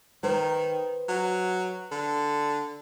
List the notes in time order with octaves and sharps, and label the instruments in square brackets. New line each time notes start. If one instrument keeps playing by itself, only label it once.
[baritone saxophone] D#3 [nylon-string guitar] B4 C5
[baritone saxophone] F#3
D3